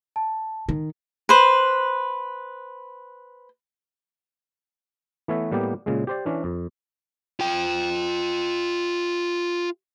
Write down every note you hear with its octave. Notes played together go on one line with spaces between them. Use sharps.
A5
D#3
B4 C5
E3 A3 B3 C#5 E5
A2 G3 A#3 B3 G4
A#2 C#3 G#3
G4 C5 D5
E3 C#4 D4
F2
F4 G5